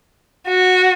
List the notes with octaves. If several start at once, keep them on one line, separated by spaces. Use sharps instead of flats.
F#4